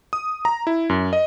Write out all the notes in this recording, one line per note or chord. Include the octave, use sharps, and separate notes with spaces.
D#6
A#5
E4
F#2
D#5